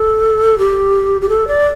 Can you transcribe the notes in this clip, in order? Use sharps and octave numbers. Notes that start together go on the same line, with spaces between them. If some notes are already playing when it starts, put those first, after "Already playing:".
Already playing: A4
G4
G4
A4
D5